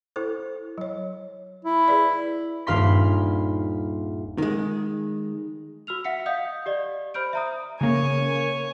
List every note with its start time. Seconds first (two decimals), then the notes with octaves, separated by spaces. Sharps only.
0.16 E4 A4 C5
0.78 F#3 C#5
1.65 E4
1.88 G#4 B4 D5
2.67 D#1 G2 F5 B5 C6 B6
4.38 D#3 G#3
5.87 F#4 E6 F6 F7
6.04 E5 F#5 B6 C#7
6.26 D#5 F5 D#6 G6
6.66 G4 D5 D#5
7.14 C5 B5 F6 G6 D7
7.33 E5 A#5 D#6
7.81 C#3 A#3 C#5 G#5